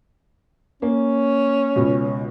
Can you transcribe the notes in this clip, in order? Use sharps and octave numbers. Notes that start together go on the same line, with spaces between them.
A#3 C#4
C#2 B2